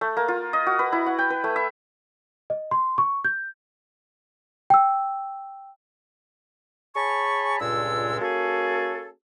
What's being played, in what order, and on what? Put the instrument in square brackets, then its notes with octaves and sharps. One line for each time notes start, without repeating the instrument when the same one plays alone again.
[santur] A3
A#3
F4
D#5
F#4
B4
E4
F#5
G5
B4
A3
E5
[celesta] D#5
C6
C#6
G6
G5 E6
[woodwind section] G#4 C#5 G#5 A5 B5 C#6
C#2 G2 A#2 G#3 A4 E6
A#3 C#4 F#4 G#4 A4